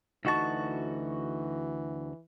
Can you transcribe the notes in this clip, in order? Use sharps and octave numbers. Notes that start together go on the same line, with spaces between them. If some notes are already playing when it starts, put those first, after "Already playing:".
D2 E3 D#4 F#4 A5 C#6